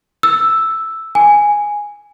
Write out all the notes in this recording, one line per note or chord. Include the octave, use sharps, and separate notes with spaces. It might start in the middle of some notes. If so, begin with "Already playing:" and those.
E6
G#5